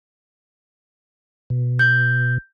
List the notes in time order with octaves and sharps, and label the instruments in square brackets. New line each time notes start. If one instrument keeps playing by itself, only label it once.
[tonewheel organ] B2
[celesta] G6